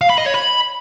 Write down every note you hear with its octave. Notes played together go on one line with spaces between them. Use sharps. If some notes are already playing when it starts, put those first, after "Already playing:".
F5
B5
D#5
C#5
B5